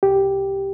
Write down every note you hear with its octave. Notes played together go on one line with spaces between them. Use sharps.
C2 G4